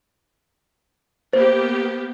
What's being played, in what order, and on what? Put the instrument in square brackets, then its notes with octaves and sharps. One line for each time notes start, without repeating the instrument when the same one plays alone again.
[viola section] A#3 B3 G4 [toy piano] C5